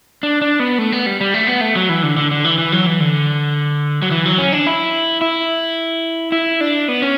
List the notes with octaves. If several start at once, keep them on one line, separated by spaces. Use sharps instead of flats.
D4
D4
B3
A3
B3
G3
G3
A3
B3
A3
F#3
E3
D3
D3
D3
E3
E3
F#3
E3
D3
F#3
E3
F#3
C#4
D4
E4
E4
E4
D4
B3
C#4